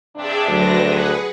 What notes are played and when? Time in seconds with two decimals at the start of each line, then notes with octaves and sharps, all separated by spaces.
0.17 G2 C3 D4 G#4 D5 E5
0.48 D2 F#3 B4 A#6
0.84 G#4 B4 F#5